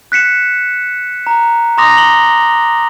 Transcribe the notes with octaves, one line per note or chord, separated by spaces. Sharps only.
F#6 B6 C#7 E7
A#5
A#5 C6 D6 D#6 A#6 F7
F#7 G7